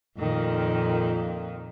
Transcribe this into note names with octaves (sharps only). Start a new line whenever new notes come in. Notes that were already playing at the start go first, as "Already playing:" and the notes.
F2 A#2 D#3